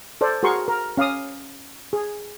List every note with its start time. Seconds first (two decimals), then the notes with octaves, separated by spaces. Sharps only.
0.21 A4 C5 D5
0.43 F#4 G#4 A#4 C6 C#6
0.68 A#4
0.97 C#4 F5 D6 D#6
1.93 G#4